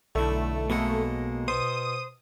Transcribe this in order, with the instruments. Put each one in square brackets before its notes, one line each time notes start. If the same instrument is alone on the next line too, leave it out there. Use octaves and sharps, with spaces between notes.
[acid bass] B1 [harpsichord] D3 E4 [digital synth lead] A3
[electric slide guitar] B2 G#3 A#3 [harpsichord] A4 D#5 F#5
[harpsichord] B2 [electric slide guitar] C5 [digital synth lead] D#6